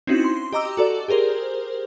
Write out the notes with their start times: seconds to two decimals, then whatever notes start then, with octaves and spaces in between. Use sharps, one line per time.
0.07 C4 C#4 D#4 E4 F#4
0.24 C6
0.53 G4 D#5 A#5 D6 E6
0.77 F#4 A4 D5
1.08 G4 G#4 A#4 C5